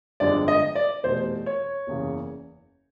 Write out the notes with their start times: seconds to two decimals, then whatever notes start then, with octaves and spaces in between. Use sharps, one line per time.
0.20 G1 F2 D3 F3 G#3 D5
0.48 D#5
0.75 D5
1.03 F1 E2 B2 C5
1.46 C#5
1.87 F#1 E2 C#3